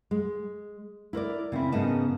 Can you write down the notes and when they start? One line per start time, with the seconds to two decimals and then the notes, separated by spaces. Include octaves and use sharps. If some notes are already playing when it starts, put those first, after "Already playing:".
0.11 G#3
1.13 E4 A#4 C5 D5
1.52 C#3 C4 C#4 E4
1.72 G#2 C#3 B3 A#4 D#5 A5